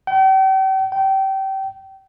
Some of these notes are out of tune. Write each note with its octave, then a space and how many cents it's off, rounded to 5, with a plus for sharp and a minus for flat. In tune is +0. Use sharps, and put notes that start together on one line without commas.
G5 -40
G5 -25